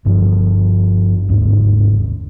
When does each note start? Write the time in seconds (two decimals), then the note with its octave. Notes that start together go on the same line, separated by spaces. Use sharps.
0.05 G1 G2 F3
1.29 G1 D#2 G#2